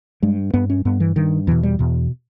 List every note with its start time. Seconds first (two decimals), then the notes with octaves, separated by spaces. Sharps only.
0.23 G2 G#3
0.53 G2 B3
0.70 C#4
0.85 G2 B3
1.00 E3
1.16 G2 D#3
1.47 E2 B2 E3
1.63 G3
1.79 E2 B2